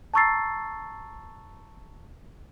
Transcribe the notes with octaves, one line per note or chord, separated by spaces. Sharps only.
A5 A#5 C#6 E6 A6 C7